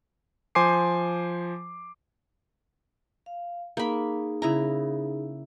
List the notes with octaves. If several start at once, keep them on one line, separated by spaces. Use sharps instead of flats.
F3 C5 G#5 C6 D6 C7
F5
A#3 D#4 G#4 B5
C#3 E4 A#5